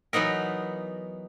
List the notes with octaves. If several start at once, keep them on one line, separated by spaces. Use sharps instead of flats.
E3 F#3 B3 D#4 A#4